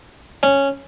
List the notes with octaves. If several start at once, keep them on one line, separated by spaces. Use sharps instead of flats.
C#4